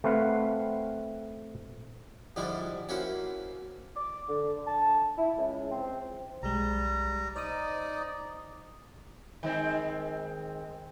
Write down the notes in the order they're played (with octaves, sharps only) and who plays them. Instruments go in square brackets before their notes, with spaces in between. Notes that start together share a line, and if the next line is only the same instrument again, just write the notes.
[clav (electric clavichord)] A3 C4 B4 F5 F#5
[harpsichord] G#2 D3 F3 G3 D4 E4
A#3 C#4 E4 F#4 C5
[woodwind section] D6
D3
A5
E4
C#2
C4
[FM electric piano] B1 G#3 [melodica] G3 A#5
[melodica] D#4 D5 [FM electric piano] C5 D#6
[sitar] D#3 G#3 C4